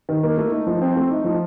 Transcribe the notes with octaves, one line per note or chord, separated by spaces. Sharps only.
D#3
A#3
A3
D#4
F3
C4
A3
D#4
F3